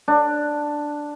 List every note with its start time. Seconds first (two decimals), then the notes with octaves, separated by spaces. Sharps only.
0.08 D4